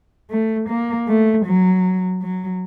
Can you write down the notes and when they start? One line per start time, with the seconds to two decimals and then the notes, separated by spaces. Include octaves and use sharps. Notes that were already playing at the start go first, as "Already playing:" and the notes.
0.30 A3
0.69 A#3
1.08 A3
1.45 F#3
2.22 F#3